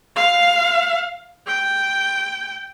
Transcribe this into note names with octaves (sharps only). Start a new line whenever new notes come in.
F5
G5